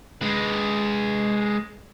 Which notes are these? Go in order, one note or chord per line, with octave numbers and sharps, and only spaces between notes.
G#3 B4